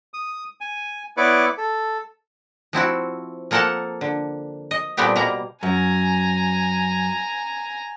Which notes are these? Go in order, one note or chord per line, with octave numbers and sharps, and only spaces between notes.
D#6
G#5
B3 E4 B4 C#5 D5 D6
A4
F3 C4 E4 F#4
F3 A#3 A4 A#4 F#5 A5
D3
D#5
A#2 G3 A3 B3 C4 G4
B2 G3 A#3 A#5
F#2 G#5 A#5